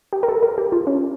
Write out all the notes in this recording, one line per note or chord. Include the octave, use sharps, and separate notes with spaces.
G4
A#4
A4
A#4
G4
F4
C#4